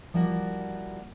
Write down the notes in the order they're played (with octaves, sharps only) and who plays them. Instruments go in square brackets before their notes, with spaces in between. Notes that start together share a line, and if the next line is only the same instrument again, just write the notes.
[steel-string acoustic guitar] F3 G3 A#3 E4 F#4